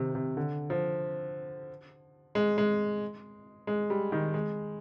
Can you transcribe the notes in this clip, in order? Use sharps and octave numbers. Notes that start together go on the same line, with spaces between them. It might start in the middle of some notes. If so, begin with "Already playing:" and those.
Already playing: C3 D#3
C3
D3
F3
G#3
G#3
G#3
G3
D#3
G#3